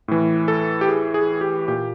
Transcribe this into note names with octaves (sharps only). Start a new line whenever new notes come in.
A2 E3
A4
G4
G#4
G#4
G4
A#2 G4